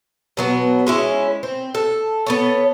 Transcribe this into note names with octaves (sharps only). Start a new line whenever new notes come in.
B2 F#3 B3
G#3 C#4 E4
C4
A4
B3 A4 C#5